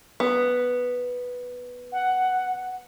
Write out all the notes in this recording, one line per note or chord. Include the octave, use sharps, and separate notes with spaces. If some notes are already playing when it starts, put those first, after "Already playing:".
B3
F#5